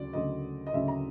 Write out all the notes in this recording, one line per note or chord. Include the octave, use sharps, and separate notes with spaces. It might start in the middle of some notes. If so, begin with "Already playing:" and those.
Already playing: D2 C#3 F#3 D5
D2 C#3 F#3 D#5
D#5
D2 C#3 F#3 E5
A#5